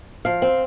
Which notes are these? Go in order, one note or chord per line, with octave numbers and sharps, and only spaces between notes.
F3 F5
C4